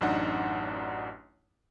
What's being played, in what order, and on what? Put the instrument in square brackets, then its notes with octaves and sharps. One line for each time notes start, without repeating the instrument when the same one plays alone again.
[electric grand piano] A1 F#2 D4 D#4 F#5